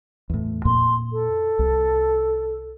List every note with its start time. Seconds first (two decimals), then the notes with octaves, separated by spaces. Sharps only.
0.30 E2 A2
0.65 F2 A#2 A#3 C6
1.12 A4
1.59 C2